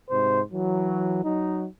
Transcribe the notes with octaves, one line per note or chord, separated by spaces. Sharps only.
G#2 C3 C5
E3 F#3
F#3 D#4